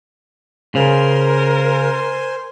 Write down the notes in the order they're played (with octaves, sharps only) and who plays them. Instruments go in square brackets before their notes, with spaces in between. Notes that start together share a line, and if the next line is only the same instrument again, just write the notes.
[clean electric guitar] C#3 [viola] A#4 [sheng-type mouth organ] C5 G#5 C6